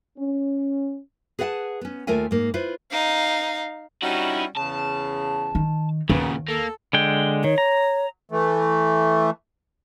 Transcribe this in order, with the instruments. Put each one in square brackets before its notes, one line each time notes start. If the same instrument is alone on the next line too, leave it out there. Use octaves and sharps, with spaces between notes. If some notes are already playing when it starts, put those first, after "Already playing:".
[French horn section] C#4
[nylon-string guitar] G#4 B4 D5 F5 F#5 A5
B3 C#4
D#2 A3 F4 A#4 E5 G#5
G#2 A#3
E4 F4 B4 C5
[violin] D#4 F5
[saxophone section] G3 C#4 F#4 [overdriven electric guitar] D#4 E4
[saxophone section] E2 C#3 [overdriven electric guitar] A5
[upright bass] D#3
[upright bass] D#2 [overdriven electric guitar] A#2 C#3 [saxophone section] A#3 B3
[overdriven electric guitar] A#3 [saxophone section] A4
[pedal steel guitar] D3 G#3 G5
[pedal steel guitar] D#3 [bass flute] C#5
[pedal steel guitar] A#5
[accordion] E3 A3